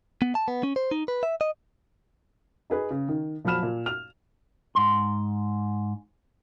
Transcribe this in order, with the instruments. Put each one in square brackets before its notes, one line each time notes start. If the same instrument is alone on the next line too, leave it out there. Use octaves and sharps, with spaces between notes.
[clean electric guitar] B3
A5
B3
C#4
C5
D#4
B4
E5
D#5
[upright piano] D#4 G#4 B4
C#3
D#3
A#2 F3 F#3 B5 F6 E7
A#2
F6 F7
[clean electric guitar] G#2 C6